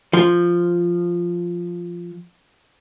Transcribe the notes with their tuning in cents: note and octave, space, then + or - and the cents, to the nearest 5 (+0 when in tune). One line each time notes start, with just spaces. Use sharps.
F3 -5